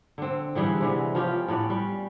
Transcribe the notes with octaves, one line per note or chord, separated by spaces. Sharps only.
D3 C4
D3 E3 G3 G#4
C3 E3 G#3 B3
F3 C#4 F4 G4
A2 C#4 D5 F#5
G3